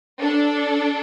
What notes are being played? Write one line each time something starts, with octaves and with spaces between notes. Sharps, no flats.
D4 A4